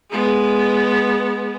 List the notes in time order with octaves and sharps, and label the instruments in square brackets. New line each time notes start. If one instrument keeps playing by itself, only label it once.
[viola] G#3 B3